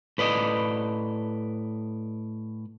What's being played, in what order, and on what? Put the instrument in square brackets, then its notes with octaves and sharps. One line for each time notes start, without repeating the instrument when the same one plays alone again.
[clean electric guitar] A2 B4 D5 D#5